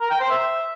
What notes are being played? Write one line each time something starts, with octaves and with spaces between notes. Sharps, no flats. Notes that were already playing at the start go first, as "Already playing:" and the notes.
A#4
G5
C5
E5